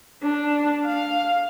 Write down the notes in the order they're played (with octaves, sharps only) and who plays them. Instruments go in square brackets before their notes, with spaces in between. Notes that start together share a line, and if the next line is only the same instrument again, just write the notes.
[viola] D4
F5